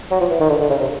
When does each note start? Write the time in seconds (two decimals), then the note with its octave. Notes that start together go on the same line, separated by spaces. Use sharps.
0.11 F#3
0.20 F3
0.30 E3
0.40 D#3
0.50 D3
0.60 D3
0.70 C#3
0.80 C3